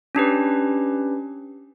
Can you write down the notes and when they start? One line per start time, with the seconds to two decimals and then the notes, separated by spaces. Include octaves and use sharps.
0.15 C#4 D4 G4 B4